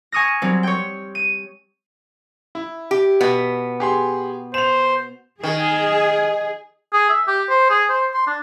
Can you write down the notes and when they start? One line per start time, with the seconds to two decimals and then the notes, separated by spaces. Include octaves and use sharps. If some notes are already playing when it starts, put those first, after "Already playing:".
0.12 G#5 C#6 D#6 F6 A#6
0.42 F#3 G3 C4
0.63 C#5 G5
1.15 D#7
2.55 E4
2.91 G4
3.21 B2 B3
3.80 G4 G#4 C6
4.54 C5 E7 F7
5.43 D#3 G#4
6.93 G#4
7.09 E5
7.27 G4
7.50 C5
7.70 G#4
7.90 C5
8.14 C6
8.27 D4